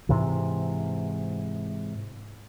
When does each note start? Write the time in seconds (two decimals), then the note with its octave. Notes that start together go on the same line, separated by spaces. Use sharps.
0.09 G#2 C3 E3